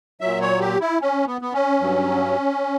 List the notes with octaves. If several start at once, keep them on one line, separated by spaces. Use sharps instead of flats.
A#2 F#3 E5
C#5
G4
E4
C#4
B3
B3
C#4
G2 F#3